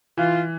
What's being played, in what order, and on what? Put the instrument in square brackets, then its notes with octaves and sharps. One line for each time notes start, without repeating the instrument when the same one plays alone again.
[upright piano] E3 [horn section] F4